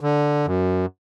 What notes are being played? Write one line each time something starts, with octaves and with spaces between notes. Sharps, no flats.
D3
F#2